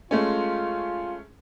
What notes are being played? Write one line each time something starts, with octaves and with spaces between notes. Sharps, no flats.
G#3 A3 C#4 F4